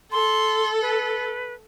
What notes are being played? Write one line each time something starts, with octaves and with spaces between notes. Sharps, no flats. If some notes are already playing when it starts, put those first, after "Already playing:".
A4 C6
B4